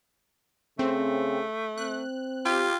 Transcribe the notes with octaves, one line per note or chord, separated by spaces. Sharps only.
C#3 A3 C4
C4 F#6
F4 G4